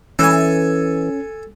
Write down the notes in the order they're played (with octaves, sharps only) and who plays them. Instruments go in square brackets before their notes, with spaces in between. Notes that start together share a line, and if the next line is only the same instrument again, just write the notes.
[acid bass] E3 [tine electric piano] C#4 [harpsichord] A4 G#5